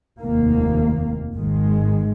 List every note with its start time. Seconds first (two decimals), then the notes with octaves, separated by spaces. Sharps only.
0.20 F1 D#2 D#3 A#3
1.34 G#1 G#2 D#3 G#3